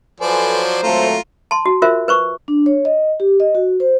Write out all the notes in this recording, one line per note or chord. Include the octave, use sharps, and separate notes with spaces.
F3 F#3 A4 B4 C5 D5 G#5
G#1 F#3 A3 F4 A#5
A5 C6
F#4
F4 A#4 C5 E5
B4 C5 C#6
D4
C#5
D#5
G4
D#5
F#4
C5